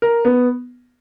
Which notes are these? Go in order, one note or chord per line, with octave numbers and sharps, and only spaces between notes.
A#4
B3